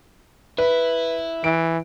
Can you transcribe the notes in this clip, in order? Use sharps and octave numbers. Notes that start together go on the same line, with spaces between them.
E4 B4
E3 D7